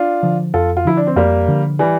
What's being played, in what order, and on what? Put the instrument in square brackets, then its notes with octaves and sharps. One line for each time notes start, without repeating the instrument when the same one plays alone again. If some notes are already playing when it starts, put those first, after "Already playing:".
Already playing: [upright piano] D4 F4
[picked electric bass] D3 F3
[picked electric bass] F2 [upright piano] F4 A4
[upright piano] F4
[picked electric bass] D3 F3 [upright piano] E4
[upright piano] D4
C4
[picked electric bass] F2 [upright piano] G3 A#3
[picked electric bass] D3 F3
[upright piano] E3 G3